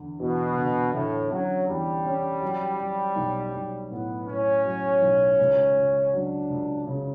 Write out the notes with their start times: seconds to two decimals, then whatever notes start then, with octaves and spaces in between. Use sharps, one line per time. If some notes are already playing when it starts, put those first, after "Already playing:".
Already playing: E2 D3
0.20 E2 B2
0.57 D3
0.93 A2 D3
1.31 F#3 C#4
1.68 E2 G3
2.05 C#4
2.42 F#3
2.80 F#3
3.16 B1
3.54 B1
3.91 A2 B3
4.27 A2 C#4
4.64 F#3
5.02 B1
5.39 C#2
5.77 C#2
6.13 F#3 D4
6.50 C#2
6.87 C#3